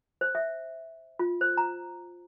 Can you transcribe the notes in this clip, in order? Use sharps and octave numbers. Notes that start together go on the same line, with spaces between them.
C5
E5
F4
C5
A#5